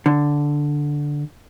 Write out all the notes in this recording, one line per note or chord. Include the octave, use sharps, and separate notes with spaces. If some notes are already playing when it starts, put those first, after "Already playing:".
D3